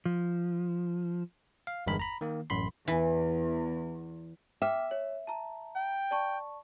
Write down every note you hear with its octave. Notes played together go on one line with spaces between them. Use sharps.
F3
F5
G1 E2 G2 G#3 A#4 B5
A#5 B5
D#3 A#3
A1 F#2 B5 C6
E2 E3
E5 G5 D6 F6
C#5
A5 A#5
G5
D5 A5 C#6